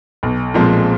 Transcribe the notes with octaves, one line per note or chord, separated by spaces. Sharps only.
B1
A#2 F3 G#3 C4